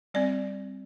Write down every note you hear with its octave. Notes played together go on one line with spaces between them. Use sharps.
G3 C4 D5